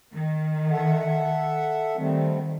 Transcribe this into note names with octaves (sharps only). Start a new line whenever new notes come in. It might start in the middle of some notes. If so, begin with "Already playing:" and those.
D#3
A4 E5 F#5
D#3 G3 A3 C4